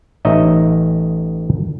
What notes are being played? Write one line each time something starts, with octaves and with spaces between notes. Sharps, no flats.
A1 D#4 C#5 D#5 E5